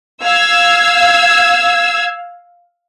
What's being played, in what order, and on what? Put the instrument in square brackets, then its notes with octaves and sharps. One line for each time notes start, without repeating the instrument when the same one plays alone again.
[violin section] F5 E6 G#6